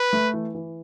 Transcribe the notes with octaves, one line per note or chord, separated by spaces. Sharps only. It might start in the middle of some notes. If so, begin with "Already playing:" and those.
Already playing: B4
A3
E3
E3